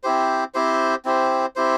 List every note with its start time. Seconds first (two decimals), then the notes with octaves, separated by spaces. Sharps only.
0.03 C4 E4 G4 C5
0.54 C4 E4 G4 C5
1.05 C4 E4 G4 C5
1.56 C4 E4 G4 C5